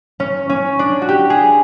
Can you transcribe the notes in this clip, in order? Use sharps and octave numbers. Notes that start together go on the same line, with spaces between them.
C#4
C#4
D4
F#4
G4
G#4